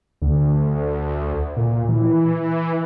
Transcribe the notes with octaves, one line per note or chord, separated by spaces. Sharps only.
D2
A#2
E3